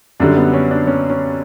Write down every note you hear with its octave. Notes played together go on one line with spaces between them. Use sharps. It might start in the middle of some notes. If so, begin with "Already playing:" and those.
F#2 D3 G3 D4
B3
C#4
D4
C#4
C#4